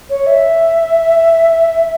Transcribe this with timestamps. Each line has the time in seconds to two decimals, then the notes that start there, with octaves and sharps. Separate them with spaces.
0.10 C#5
0.27 E5